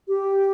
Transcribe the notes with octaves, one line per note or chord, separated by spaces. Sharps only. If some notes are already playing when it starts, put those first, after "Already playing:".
G4